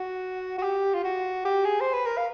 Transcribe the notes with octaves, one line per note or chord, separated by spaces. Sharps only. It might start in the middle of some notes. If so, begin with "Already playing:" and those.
Already playing: F#4
F#4
G4
F4
F#4
G4
G#4
C5
B4
A#4
F5